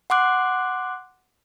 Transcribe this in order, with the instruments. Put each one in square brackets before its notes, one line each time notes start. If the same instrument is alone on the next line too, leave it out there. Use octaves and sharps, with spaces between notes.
[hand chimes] F#5 C6 D6 F#6